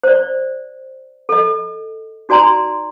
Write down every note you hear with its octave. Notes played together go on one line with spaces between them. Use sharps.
C5 D5
A4 D#5
D#4 F#4 D5 G#5 A#5 C6